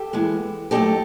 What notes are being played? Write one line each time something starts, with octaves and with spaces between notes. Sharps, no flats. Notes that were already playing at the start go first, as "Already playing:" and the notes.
Already playing: G4 A4
E3 G#3 B3
F#3 A3 C4 D#4 G4 A4